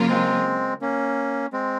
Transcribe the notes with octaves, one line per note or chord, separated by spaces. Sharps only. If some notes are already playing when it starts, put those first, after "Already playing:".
Already playing: C#3 F#3 A#3 F4 A#4
G#3 C4
A#3 C#4
G#3 C4